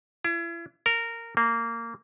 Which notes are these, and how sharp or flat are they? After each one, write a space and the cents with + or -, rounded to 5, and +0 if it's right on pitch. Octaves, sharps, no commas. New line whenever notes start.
E4 +40
A#4 -15
A#3 -15